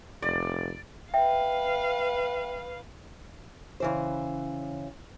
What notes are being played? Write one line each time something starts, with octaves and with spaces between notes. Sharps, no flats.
F1 D5
B4 E5 F5 G5
C#3 E3 C5